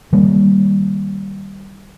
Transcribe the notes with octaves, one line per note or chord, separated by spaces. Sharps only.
D#3 G3 A#3